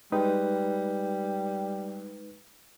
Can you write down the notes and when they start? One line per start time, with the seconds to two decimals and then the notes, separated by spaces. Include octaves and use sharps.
0.12 G3 G#3 D#4 B4